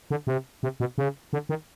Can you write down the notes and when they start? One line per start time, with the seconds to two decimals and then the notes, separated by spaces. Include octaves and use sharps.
0.11 D3
0.27 C3
0.63 C3
0.80 B2
0.98 C#3
1.33 D3
1.49 D#3